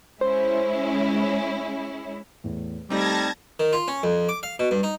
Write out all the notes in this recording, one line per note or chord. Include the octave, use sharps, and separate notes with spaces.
G#3 C#4 E4 C5
E2 A2
G3 A3 C4 D#4 A5 G#6 A#6
D#3
F4
C#4
F2
D6
F5
B2
G2
D#4